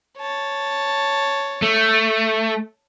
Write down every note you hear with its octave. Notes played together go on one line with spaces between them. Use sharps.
C#5 A5
A3